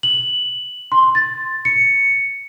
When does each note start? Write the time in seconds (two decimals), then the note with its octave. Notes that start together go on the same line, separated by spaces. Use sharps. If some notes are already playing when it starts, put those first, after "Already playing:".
0.03 F#7
0.92 C6
1.15 A6
1.65 C#7